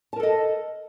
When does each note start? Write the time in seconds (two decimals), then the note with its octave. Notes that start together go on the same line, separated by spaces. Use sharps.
0.13 A5
0.16 A#4
0.20 A4
0.23 D#5